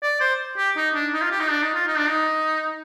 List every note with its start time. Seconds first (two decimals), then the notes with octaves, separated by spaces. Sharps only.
0.03 D5
0.21 C5
0.58 G4
0.77 D#4
0.95 D4
1.14 D#4
1.22 F4
1.31 G4
1.41 D#4
1.51 D4
1.62 D#4
1.75 F4
1.87 D#4
1.98 D4
2.08 D#4